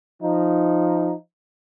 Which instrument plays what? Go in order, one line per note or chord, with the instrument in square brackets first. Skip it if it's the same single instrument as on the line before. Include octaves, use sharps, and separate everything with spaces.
[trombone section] F3 D#4